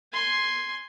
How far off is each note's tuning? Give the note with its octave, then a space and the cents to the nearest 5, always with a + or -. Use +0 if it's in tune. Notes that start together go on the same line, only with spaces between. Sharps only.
G#5 +0 C6 +0